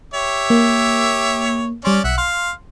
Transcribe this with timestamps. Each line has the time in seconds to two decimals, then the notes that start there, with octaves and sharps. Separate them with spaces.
0.14 G4 C#5 E5
0.50 A#3
1.85 G3 C#4 D5 C6
2.04 B1 E5 F#5
2.18 F5 C6